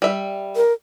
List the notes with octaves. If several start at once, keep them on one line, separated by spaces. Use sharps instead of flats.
G3 E5
A#4